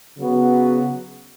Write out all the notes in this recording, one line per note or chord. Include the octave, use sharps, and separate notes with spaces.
C#3 F#3 B3 F#4